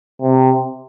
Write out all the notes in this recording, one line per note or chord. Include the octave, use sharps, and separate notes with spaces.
C3